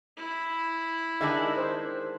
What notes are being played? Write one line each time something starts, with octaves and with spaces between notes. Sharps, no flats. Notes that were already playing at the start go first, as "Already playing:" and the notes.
E4
D#3 G#3 D4 E5
C5